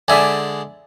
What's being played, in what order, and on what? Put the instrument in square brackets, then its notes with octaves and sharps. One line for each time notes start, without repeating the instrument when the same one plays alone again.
[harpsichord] D3 G#3 [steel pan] D5 E5 G#5